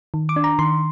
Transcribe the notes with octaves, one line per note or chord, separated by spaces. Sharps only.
D#3
D6
D4
A#5
D#3 C6